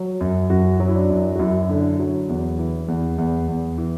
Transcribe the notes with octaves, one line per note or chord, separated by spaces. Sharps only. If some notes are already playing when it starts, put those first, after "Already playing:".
Already playing: F#3
F#2
F#2 F#4
F#3
E4
D4
F#2
F#4
F#2 E4
D3
F#3
E2
E3
E2
E2
E2
E3